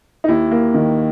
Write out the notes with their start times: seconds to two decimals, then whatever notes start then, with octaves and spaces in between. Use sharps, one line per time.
0.24 D#4
0.28 D#2 E4
0.51 A#3
0.74 D#3